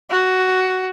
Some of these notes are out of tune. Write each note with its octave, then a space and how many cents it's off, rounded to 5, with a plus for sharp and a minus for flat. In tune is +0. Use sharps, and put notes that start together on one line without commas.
F#4 +10